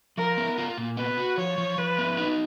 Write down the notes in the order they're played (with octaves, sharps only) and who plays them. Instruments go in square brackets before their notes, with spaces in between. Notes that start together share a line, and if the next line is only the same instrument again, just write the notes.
[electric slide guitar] F3 [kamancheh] A#4
[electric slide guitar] B3
F4
A#2
[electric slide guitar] B3 [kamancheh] B4
[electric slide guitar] F#4
[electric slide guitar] F3 [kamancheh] C#5
[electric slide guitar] F3
[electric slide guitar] F3 [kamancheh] B4
[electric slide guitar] B3
D#4